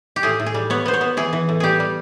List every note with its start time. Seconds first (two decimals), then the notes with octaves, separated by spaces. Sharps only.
0.16 G4
0.23 A2 G#4
0.40 A2
0.46 G#4
0.54 G3
0.70 B3 C#5
0.86 B3 C5
0.94 C#5
1.01 B3
1.17 E3 G#4
1.33 E3
1.49 A2
1.60 G3 G4 G#4
1.80 G3